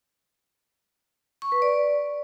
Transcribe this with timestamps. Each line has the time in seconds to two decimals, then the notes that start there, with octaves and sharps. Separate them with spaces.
1.42 C#6
1.52 B4
1.62 D5